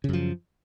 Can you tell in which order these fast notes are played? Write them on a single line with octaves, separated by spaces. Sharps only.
C#3 F#2 F3